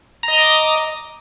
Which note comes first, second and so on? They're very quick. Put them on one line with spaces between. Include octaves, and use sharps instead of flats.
A#5 D#5 D#6 D6